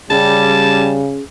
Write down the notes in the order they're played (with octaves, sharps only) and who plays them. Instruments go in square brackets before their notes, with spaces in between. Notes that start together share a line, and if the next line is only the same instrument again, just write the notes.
[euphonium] C#3 [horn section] G3 [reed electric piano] C#4 G#4 [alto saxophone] A5